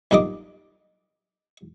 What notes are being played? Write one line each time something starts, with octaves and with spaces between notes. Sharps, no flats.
B1 G2 A#3 F4 D#5 D6